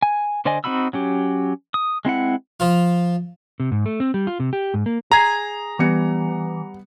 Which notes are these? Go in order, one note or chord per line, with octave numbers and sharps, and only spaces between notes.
G#5
D3 C5 D5 D#5 G#5
C4 D#4 F#4 B5 E6
F#3 C#4 G4
D#6
G#3 C4 E4 F#5
F3 F4
C3
G#2
A3
C4
G3
F4
C3
G4
G#2
A#3
G#4 G#5 A#5
E3 G3 B3 C#7